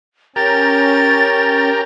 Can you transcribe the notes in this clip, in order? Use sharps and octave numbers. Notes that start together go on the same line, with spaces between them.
C#4 G4 A#4 A6